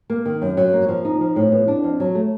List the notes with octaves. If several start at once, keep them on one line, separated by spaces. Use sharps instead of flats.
A#3
D#3
F#2
F#3
A#3
F3
D#4
F3
A2
B3
D4
F2
F#3
A3